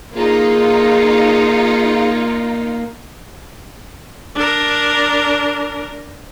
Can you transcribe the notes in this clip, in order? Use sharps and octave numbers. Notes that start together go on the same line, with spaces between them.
A#3 D#4 F4 G#4
D4 A#4